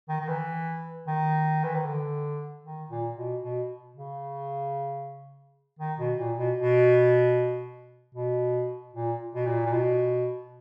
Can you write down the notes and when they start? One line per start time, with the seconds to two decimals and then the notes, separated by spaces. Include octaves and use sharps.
0.09 D#3
0.21 D#3
0.28 E3
1.07 D#3
1.64 E3
1.75 D#3
1.85 D3
2.64 D#3
2.91 A#2
3.17 B2
3.43 B2
3.96 C#3
5.79 D#3
5.99 B2
6.19 A#2
6.37 B2
6.58 B2
8.15 B2
8.93 A#2
9.35 B2
9.46 A#2
9.66 A#2
9.72 B2